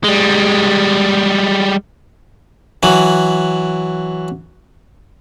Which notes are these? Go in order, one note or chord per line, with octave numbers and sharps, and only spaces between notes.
G3 G#3
E3 F#3